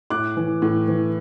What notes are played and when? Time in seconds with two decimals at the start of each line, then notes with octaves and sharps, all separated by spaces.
0.10 A2 D6 F#6
0.37 E3
0.62 A2
0.88 E3